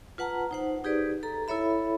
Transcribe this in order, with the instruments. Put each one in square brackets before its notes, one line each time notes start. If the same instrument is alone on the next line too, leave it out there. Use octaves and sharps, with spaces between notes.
[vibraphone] F4 B4 F#5 A5 A#5
D#4 C5 F#5
D#4 G4 G#4 B4 D5
A4 A#5
E4 A4 C#5 E5 B5